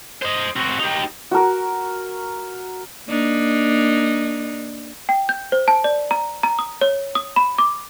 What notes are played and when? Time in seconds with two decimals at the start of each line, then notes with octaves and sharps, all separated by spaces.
0.22 C5 D#5
0.56 C4 F#4
0.80 D#4 G4
1.31 F#4 A#4
3.08 A#3 D4 D#4
5.09 G5
5.29 G6
5.52 C5
5.68 A5
5.84 D5
6.11 A#5
6.43 A#5
6.59 D#6
6.81 C#5
7.15 D#6
7.36 B5
7.58 D6